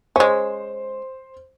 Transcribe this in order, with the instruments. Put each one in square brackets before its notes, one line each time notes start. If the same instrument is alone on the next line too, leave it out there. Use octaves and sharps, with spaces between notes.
[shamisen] G#3 C#4 [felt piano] C5